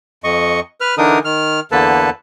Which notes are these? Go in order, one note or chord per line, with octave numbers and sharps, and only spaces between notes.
F2 D#5 C#6
B4 F6
D3 E3 D4 D#4 A#4 D#6
D#3 F6
E2 D3 A#3 A4 B4 A5